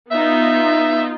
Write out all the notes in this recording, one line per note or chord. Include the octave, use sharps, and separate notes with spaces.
B3 D#4 F4 E5